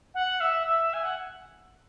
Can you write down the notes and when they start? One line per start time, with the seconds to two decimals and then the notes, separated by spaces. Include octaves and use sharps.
0.14 F#5
0.40 E5
0.67 E5
0.93 G#5
1.03 F#5